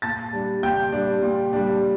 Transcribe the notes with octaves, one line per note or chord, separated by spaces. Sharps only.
A#2 A5 A6
G3 D4
A#2 G5 G6
G3 D4
A#2
G3 D4